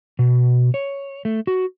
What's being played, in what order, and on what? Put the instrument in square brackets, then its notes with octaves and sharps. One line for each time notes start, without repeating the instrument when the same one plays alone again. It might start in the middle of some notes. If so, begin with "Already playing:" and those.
[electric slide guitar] B2
C#5
A3
F#4